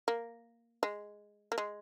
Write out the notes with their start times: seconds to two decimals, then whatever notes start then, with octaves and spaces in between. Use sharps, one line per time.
0.08 A#3
0.83 G#3
1.52 A#3
1.58 G#3